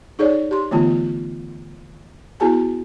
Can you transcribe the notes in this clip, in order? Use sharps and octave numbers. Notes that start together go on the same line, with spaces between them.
D#4 G#4 A4 C#5 D5
G4 C6
D3 E3 A3 B3 F4
B3 E4 F#4 G#4 G#5 A5